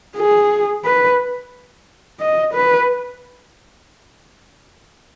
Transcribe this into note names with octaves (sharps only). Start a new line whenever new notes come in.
G#4
B4
D#5
B4